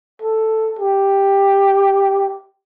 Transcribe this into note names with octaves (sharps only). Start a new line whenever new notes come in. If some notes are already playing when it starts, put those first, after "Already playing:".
A4
G4